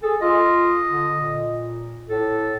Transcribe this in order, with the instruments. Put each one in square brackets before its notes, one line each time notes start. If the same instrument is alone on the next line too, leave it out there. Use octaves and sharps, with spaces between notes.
[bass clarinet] G#4 [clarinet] A4
[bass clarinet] F4 [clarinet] D#5
[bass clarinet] D3
A#2
[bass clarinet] A2 [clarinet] A4